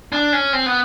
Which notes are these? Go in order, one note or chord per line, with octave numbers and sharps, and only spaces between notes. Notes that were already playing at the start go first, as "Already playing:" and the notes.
D4
C#4
C4
B3